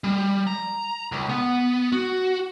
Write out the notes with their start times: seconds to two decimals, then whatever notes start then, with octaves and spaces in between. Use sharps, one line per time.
0.04 G3
0.47 A#5
1.12 C#2
1.29 B3
1.92 F#4